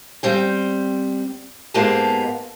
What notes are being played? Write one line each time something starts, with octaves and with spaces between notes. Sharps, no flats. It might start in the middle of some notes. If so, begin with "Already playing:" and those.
G3 C4 G5
G#2 G#3 A#3 B3 G4 A5